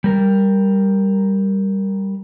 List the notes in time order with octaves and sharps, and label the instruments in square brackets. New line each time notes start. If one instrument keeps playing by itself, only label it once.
[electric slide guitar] G3 A#4